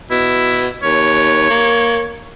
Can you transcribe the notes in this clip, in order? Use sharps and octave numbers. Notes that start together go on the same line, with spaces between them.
B2 E4
D#2 C#5
A#3